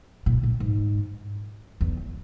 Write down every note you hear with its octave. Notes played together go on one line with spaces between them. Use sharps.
A#2
A2
G#2
E2